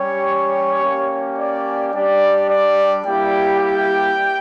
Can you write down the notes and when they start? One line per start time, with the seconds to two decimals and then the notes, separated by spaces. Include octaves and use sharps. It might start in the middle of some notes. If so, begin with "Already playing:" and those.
Already playing: G3 C#4 G4 C#5
0.82 A#3 C#4 G4
1.37 D5
1.93 G3 D4 G4 D5
2.48 D5
3.04 G3 A#3 E4 G4 G5
3.59 G5